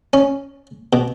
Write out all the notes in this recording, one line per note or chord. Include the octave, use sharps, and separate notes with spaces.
C#4
B2